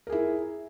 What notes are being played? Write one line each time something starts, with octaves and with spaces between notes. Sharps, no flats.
E4 G#4 A#4